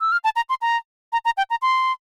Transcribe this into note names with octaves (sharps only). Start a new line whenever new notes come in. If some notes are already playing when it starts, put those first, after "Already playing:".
E6
F6
A5
A#5
C6
A#5
A#5
A#5
G5
A#5
C6